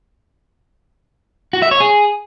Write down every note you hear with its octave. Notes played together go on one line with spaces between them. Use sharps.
F#4
E5
C#5
G#4